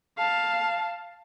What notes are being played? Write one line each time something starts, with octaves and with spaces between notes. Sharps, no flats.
F5 A5